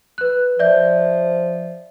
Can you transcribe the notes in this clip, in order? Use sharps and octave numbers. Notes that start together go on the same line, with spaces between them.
B4 F#6
F3 D5 E5 G6